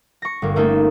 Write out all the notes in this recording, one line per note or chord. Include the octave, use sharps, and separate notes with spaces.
C#6 A#6
G1 A#3
A3 A#3 C#4 D#4 A4